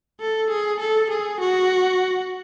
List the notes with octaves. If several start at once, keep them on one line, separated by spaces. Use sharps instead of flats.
A4
G#4
A4
G#4
F#4